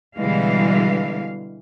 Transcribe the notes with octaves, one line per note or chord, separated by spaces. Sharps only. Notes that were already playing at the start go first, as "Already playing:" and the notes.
B2 D3 E3 G3 G#3 F5